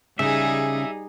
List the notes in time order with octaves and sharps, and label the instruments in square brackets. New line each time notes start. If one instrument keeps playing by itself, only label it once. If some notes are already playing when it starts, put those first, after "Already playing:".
[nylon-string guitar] C#3 [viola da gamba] G3 D#4 G#4 [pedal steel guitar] E5